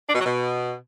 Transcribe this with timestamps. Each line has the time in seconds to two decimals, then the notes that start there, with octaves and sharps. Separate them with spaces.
0.09 D4
0.15 B2
0.20 F#3
0.26 B2